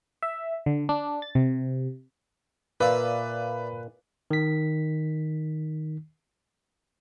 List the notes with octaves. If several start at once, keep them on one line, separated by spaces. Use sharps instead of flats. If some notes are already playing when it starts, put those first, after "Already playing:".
E5
D3
D4
A6
C3
A#2 B4 D5 E5 F5
D#3 B6